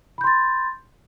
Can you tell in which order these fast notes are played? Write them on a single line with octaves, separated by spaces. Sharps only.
B5 G6 C6 A6